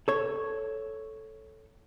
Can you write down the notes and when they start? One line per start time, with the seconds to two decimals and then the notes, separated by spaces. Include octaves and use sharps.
0.08 A4 C#5